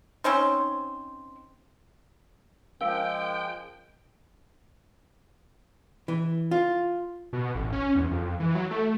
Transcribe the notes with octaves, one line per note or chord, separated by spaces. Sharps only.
C4 C#4 D#4 C5
F3 G#3 C#4 A#4 F5 G5
E3
F4
B2
A1
C#4
E2
F2
E3
F#3
A3